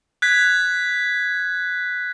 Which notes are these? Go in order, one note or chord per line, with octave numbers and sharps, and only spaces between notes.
F#6 G#6 B6